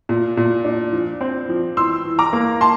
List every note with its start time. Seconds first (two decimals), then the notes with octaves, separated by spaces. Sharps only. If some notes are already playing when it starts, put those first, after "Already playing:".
0.09 A#2
0.37 A#2
0.65 D4
0.93 F3
1.21 C4
1.49 F3
1.77 E3 C6 E6
2.05 E3
2.19 A#5 D6
2.33 A#3
2.61 A5 C6